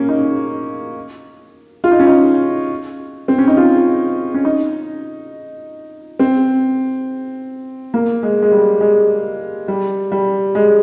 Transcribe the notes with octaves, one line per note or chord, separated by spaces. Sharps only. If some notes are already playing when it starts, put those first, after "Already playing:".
Already playing: A#3 C#4
D#4
F4
D#4
C#4
D#4
C4
C#4
D#4
F4
C#4
D#4
C4
A#3
G#3
G#3
G3
G#3
G3
G3
G#3